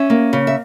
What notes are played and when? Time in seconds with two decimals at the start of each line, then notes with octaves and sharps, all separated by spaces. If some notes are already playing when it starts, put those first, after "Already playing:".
Already playing: C#4 E5
0.10 A#3
0.33 C#3
0.47 E5